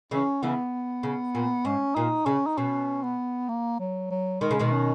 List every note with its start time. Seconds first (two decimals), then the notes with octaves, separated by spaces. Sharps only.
0.11 C#3 E3 C#4
0.43 C#3 E3 B3
1.03 C#3
1.35 A#2
1.65 G#2 C#4
1.95 A#2 D#4
2.26 C#3 C#4
2.47 D#4
2.58 B2 C#4
3.03 B3
3.49 A#3
3.80 F#3
4.11 F#3
4.41 D#3 G#3
4.51 C#3
4.59 B2 D#3
4.72 C#4